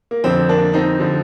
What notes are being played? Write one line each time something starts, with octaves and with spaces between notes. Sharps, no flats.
A#3
F2 D3 F3 C4
A#3 D4
C4 D#4
D3 F3